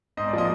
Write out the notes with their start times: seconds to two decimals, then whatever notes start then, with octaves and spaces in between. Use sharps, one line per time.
0.17 G#2 D#5
0.28 D5
0.33 F3 A#3 D#5